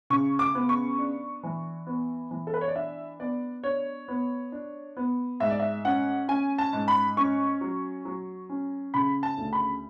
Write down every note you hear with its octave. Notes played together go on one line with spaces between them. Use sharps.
C#3 C#6
D6
B3
C#6
D4
E3
B3
E3
A4
B4
C#5
D5
D4 E5
B3 D5
D4 C#5
B3
D4
B3
G#2 E5
D5
E5
C#4 F#5
C#4 G#5
A5
G#2
B5
C#4 C#6
F#3
F#3
C#4
C#3 B5
A5
D2
B5